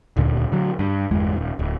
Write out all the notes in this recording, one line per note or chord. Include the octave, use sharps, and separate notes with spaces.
D#1 D2 A#2 D3
D3 F#3
G2
G1 E2 G#3
D#1
D1